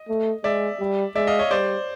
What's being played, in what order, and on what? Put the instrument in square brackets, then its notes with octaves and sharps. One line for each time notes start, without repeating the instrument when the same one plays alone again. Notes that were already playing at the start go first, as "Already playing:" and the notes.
Already playing: [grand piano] D#5
[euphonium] A3
[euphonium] G#3 [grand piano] D5 E5
[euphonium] G3
[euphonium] G#3 [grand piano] D5 E5
[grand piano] D#5 F5
C#5 D#5
[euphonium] G3 [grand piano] C5 D5